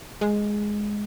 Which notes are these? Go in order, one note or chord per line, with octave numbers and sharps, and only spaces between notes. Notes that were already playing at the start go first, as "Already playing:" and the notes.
G#3